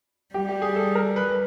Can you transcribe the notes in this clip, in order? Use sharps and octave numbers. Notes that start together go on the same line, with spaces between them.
G3 G4
G4
G#4
A4
A#4
B4